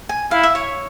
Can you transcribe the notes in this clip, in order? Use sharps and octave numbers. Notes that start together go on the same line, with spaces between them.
G#5
E4 F5
E5
C#5